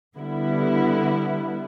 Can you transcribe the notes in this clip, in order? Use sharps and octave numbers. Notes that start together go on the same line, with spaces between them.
D3 G3 B3 E4